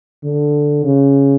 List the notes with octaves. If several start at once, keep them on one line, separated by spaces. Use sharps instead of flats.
D3
C#3